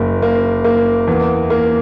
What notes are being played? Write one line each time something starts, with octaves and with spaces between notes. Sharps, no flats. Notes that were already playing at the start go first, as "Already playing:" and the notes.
Already playing: F#1 A#3
A#3
A#3
E2
A#3